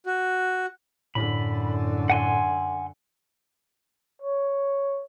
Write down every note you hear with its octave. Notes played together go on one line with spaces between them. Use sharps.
F#4
F#2 A2 D3 B5
F#5 G#5 C6
C#5